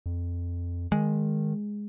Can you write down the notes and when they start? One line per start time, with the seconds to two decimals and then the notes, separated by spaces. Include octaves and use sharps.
0.06 F2
0.92 D#3 G#3